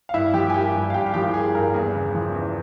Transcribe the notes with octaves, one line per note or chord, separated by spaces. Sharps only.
F5
G2 E4 E5
F3 G4 G5
G#5
A#3 G4 G5
G2
F5
G2 G4 G5
F5
F3 G4 G5
A#3 G#4
G2 A#4
E2 G#4
C#3
F3
E2